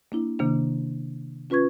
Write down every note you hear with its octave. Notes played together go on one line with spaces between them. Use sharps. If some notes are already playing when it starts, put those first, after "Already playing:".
A#3 D4 E4
C3 D#3 A#3 D4
C#4 F4 B4 C#6 G#6